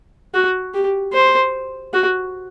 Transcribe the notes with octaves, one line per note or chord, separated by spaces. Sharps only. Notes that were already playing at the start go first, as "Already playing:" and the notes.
F#4
G4
C5
F#4